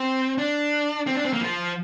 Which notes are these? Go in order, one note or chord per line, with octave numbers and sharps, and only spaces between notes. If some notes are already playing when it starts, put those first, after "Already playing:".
Already playing: C4
D4
C4
D4
C4
A#3
F3